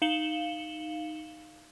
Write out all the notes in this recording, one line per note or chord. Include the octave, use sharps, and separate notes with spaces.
D#4 F5 C#7 E7 F#7 G7